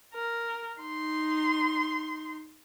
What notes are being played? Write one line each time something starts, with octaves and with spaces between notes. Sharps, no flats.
A#4
D#4 C6